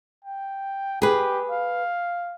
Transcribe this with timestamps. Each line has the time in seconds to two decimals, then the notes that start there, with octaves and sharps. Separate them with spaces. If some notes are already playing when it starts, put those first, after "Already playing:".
0.25 G5
1.02 G4 G#4 B4
1.51 F5